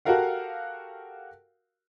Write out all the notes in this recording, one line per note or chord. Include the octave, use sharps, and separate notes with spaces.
F#4 G4 A4 A#4 F5 F#5